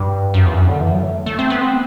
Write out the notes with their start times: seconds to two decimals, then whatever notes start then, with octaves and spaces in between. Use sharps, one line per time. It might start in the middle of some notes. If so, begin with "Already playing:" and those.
Already playing: G2
0.34 F#2
0.46 E2
0.57 F#2
0.69 D3
0.81 E3
0.92 F#3
1.03 A3
1.26 A3
1.39 C4
1.50 B3
1.61 C4